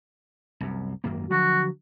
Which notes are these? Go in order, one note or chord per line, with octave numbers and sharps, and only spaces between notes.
C2 F#2
G#1 F#2 A#3
D3 F3 F#3 F#4